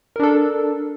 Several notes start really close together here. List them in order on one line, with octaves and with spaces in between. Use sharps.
A#4 D4 A4